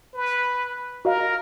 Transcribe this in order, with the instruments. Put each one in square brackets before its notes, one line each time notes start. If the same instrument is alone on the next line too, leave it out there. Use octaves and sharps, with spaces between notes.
[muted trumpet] B4
[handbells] F#4 D#5 F5 [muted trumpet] A#4